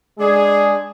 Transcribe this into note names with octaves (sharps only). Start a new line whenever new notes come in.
G#3 D4 G#4